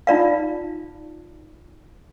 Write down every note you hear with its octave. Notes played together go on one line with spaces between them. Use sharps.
D#4 F4 D5 F5